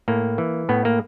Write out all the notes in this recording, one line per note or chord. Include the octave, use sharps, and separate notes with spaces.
A2 A#3
E3
A2 B3
A#3